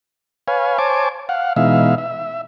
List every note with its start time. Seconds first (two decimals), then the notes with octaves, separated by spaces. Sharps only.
0.48 B4 C#5 F5 G#5
0.78 C5 C#5 G#5 A5 D6
1.29 F5 F#5
1.56 B2 E3 G#3 D#4 E5 F5
1.98 E5